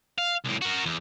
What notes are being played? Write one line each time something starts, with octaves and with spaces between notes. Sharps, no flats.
F5
C2 A2
F#4 A#4
E2